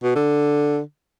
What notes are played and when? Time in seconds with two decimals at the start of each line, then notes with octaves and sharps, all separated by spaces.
0.03 B2
0.15 D3